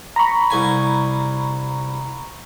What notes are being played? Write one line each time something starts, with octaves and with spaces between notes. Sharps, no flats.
A#5 B5 C#6
C2 G#5